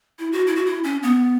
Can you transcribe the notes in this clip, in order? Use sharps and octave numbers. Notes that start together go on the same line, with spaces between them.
E4
F#4
E4
F#4
E4
C#4
B3